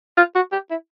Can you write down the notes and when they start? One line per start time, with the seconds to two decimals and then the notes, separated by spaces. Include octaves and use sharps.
0.17 F4
0.35 F#4
0.52 G4
0.70 E4